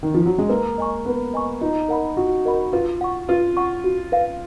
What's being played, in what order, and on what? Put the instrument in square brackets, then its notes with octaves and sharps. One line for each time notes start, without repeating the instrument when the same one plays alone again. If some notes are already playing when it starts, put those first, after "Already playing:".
[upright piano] D#3
F3
F#3
G#3
[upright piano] A#3 [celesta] B4
[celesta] D#5 G#5 C#6
[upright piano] B3 [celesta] B4
[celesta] D#5 G#5 C#6
[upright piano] D#4 [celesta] F4
[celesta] A#4 D#5 F#5 B5
[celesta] F4 [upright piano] F#4
[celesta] A#4 D#5 F#5 B5
[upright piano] F4 [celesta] B4
[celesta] F#5 C#6
[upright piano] F4 [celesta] B4
[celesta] F#5 C#6
F#4
B4 F5